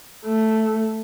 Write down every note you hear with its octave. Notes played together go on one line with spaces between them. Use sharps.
A3